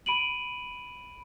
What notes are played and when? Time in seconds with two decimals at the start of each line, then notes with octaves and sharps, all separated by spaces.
0.06 B5 D7 D#7 F#7